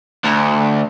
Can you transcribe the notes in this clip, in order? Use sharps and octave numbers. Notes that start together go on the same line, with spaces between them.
D2